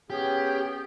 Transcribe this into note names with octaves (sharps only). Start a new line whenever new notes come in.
B3 C#4 G4 G#4